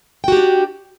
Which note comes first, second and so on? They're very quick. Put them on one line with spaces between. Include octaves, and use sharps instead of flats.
G5 F#4 G4 D4